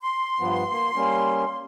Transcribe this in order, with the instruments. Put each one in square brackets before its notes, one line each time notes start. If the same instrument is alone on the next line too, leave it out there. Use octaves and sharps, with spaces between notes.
[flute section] C6
[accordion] G2 F3 B3
A#3
G3 A#3 C#4